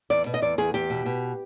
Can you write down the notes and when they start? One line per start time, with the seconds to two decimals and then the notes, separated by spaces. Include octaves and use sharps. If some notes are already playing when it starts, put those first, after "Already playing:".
0.10 E2 D5
0.26 B2
0.34 D#5
0.42 E2 D5
0.58 E2 G#4
0.74 E2 G4
0.90 B2
1.06 B2